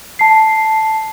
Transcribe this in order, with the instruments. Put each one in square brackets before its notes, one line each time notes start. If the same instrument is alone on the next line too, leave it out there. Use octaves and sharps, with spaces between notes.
[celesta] A5 C7